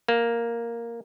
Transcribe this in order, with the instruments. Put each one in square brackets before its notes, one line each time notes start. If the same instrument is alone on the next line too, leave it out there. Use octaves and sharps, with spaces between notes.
[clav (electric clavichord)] A#3